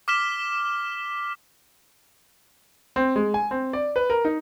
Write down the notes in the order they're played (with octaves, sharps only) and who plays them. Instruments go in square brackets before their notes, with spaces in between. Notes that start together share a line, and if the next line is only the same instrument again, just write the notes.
[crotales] D6 F6 B6 E7 G7
[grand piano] C4
G#3
G#5
C4
D5
B4
A#4
D#4